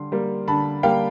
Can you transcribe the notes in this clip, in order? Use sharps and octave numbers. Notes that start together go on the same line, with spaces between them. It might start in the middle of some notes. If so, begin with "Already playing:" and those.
Already playing: D3 G3 C6
G3 A#3
D3 A5 B5
G3 A#3 F5 G5